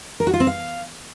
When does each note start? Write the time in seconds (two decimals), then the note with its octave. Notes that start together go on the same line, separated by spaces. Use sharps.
0.20 A#4
0.27 F#4
0.33 F4
0.40 C4
0.47 F5